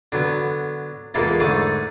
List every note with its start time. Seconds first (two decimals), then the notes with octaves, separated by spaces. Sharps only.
0.12 D3 F#3 B3
1.14 E2 A#2 G#3 A#3 E4 A4
1.40 G#2 D3 A3 G#5 D6